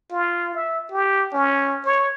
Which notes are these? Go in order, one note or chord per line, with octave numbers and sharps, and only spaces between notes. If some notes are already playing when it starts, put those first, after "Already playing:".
F4
E5
G4
C#4
C#5